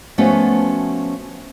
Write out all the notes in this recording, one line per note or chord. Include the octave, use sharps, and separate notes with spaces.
F3 A3 B3 C#4 F#4